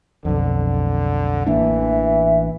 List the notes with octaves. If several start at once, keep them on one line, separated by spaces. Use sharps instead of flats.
B1 F2 D3
A1 E3 A#3 D4 E5